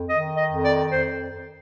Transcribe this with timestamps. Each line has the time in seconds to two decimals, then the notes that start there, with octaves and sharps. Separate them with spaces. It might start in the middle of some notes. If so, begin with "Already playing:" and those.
Already playing: F2
0.09 D#3 D#5
0.37 D#5
0.50 F2
0.64 D5
0.91 F2 C5